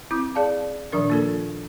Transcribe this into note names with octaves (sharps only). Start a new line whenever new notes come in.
C4 E4 D6 G6
G#4 D5 F5 A5
A#2 D#3 F3 D4 A#4
A#3 F4 A4